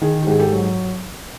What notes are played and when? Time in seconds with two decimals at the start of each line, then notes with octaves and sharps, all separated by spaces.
0.01 D#3 G#4
0.23 G4
0.27 G#2 G#4
0.39 G4 A4
0.52 F#3